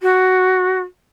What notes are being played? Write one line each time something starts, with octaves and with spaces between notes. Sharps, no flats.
F#4